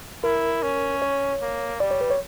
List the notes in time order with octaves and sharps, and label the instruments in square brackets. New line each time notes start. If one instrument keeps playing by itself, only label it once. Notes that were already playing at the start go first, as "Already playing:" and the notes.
[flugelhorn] E4 [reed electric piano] A#4
[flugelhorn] C#4
[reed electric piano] C#5
[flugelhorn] A#3
[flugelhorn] G3 [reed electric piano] D5
[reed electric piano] C#5
B4
C#5